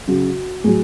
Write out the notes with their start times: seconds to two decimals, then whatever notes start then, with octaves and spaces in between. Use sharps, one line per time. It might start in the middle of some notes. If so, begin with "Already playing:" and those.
0.08 C#3 F#3 F#4
0.64 A2 F#3 G#4